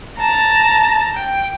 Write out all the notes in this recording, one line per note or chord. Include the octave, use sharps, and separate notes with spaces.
A5 A#5
G5